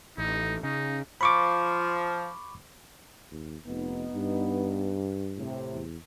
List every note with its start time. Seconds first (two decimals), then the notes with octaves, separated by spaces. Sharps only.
0.18 A1 D#4
0.63 C#3 D#4
1.21 F3 B5 C#6 D6
3.31 D#2
3.67 F1 B3 D#4
4.15 G2
5.38 A2 C3
5.73 E2